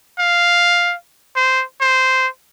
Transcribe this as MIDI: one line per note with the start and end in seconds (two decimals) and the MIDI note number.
0.19 0.95 77
1.36 1.63 72
1.81 2.28 72